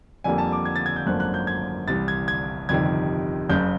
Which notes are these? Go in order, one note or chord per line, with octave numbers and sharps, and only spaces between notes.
F2 D3 G3 A#3 G#5
A5
D6
G#6
A6
G#6
G6
G#1 F#2 D3 F3 A#3 F#6
F#6
G6
G#6
C2 C3 E3 A6
G#6
G#6
G1 F2 C3 D#3 G3 G#6
F#1 F#2 C#3 G6